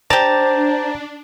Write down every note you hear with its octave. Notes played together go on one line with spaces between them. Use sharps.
D4 G4 C5 D5 A5 A#5 A6